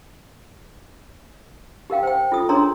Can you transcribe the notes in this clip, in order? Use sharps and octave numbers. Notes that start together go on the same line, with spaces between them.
G4 A#4 F5 G5
C5 G5
F4 A4 D#6
D4 G#4 A#4 C#5 A#5 C6